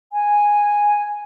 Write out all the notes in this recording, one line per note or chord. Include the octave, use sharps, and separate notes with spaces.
G#5